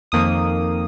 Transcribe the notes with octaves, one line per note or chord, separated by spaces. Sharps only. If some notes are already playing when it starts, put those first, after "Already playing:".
F2 D#3 A#3 D#6